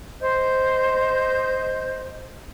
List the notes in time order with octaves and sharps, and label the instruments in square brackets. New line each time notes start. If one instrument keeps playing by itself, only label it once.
[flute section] C5 D#5 G6